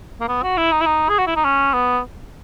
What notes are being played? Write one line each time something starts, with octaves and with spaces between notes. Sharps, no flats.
A#3
B3
F#4
E4
D#4
E4
D#4
G#4
F#4
E4
D#4
C#4
B3